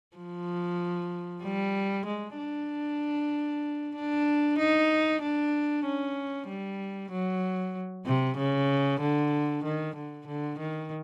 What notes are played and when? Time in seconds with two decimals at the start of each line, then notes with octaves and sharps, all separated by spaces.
0.17 F3
1.43 G3
2.06 G#3
2.38 D4
3.96 D4
4.59 D#4
5.22 D4
5.85 C#4
6.48 G3
7.11 F#3
8.06 C3
8.38 C#3
9.01 D3
9.64 D#3
9.96 D3
10.27 D3
10.59 D#3